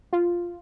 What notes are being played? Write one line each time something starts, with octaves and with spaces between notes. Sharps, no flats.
F4